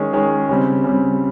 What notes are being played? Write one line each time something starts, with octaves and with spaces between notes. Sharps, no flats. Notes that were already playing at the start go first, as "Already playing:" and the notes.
Already playing: D#3 G#3 C#4 G#4
D#3 G#3 C#4 G#4
C#3 G3 C4
C#3 G3 C4